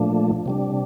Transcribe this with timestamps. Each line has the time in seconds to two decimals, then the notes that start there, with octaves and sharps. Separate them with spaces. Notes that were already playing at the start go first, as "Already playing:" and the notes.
Already playing: A#2 F3 A3 D4
0.46 C3 G3 D4